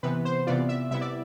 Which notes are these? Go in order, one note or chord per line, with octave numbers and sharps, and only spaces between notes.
C3 E3 B3 B4
C5
C3 E3 B3 F4 D5
E5
C3 G3 B3 E4 E5
D5